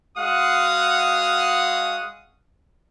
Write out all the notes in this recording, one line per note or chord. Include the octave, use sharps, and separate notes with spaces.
G#3 F#4 F5 F#5 D#6